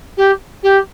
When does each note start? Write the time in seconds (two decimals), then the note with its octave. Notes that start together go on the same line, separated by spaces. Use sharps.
0.17 G4
0.63 G4